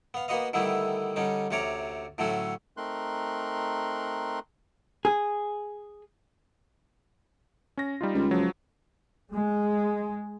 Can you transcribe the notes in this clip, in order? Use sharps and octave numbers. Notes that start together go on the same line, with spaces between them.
B3 F5
A#3 B3 F#4 B4 D#5 F5
D3 D#3 G3 A3 B3 E4
D3 G3 C#4 D#4
D2 C3 C#4 C#5 D5 A#5
A2 D3 F#3 A3 C#4 F#4
A3 C4 D#4 A#4 C6 F#6
G#4
C#4 A#6
G3 D#4 F4
C#2
F3 F#3
G#3